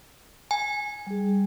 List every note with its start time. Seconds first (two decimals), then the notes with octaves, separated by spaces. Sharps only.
0.51 G#5
1.07 G3 G#4